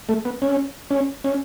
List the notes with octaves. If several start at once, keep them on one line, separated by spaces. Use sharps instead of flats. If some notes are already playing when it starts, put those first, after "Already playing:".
A3
B3
C#4
C#4
C#4